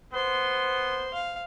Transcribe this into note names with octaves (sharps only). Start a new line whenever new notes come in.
B3 C5 C6
F5